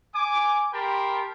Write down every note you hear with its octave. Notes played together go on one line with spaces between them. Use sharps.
G#5 D6
G4 A#4 G5 A5 B5 C6